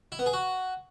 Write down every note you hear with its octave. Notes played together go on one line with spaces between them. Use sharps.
E4
B3
G#4
F#4